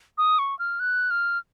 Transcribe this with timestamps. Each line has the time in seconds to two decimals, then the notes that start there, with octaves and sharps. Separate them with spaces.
0.18 D#6
0.39 C#6
0.59 F6
0.80 F#6
1.10 F6